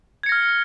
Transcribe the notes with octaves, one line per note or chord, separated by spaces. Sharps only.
F6 G#6 A#6 C#7